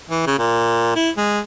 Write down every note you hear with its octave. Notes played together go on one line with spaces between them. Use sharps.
E3
C#3
A#2
E4
G#3